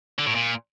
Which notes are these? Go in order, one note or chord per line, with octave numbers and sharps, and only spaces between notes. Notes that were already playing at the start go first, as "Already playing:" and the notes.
D3
A2
A#2